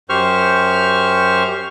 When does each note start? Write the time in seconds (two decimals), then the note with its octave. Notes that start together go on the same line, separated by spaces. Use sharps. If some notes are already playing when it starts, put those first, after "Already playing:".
0.09 F#2 G4 C5 C#6 F6